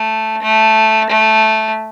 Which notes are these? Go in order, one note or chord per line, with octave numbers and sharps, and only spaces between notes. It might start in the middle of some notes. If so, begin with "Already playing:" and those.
Already playing: A3
A3
A3